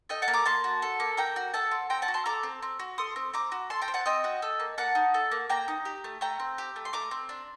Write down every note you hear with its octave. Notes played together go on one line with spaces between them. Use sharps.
A4 D#5 G5
F#5 A5
A#3
A#5 D6
A#3 A5 C6
F#4
A4
A#3
A#3 G5 A#5
F#4
A4 F#5 A5
C4
C4 G5 A#5
F#5 A5
F#4
A5 C6
A4 A#5 D6
C4
C4
F#4
A4 C6 D#6
C4
C4 A#5 D6
F#4
A4 A5 C6
G5 A#5
C4
F#5 A5
C4 D#5 G5
F#4
A4
A#3
A#3 F#5 A5
D#4
A4
A#3
A#3 G5 A#5
D#4
G4
A3
A3 G5 A#5
C4
G4
A3
C6
A3 A#5 D6
C4
D4